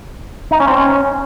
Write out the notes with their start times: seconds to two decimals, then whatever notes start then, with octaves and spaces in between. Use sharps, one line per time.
0.51 D#4
0.60 C#4
0.67 C4
0.76 C#4